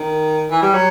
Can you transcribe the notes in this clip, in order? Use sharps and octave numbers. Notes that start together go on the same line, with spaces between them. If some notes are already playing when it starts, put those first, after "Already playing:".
Already playing: D#3
E3
G3
F#3